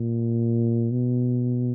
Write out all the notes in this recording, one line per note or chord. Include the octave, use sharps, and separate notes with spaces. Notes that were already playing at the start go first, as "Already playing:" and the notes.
Already playing: A#2
B2